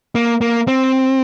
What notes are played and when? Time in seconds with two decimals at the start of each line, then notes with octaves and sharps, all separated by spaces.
0.15 A#3
0.41 A#3
0.68 C4